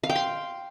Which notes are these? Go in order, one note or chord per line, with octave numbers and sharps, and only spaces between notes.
F5
G5
C6